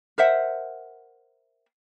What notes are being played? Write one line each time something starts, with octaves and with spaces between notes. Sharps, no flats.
A#4 C5 E5 F#5